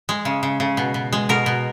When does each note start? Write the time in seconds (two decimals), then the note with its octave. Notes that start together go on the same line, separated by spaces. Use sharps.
0.09 G#3
0.25 C#3
0.43 C#3
0.60 C#3
0.77 B2
0.94 B2
1.13 G#3
1.29 B2 A#4
1.46 B2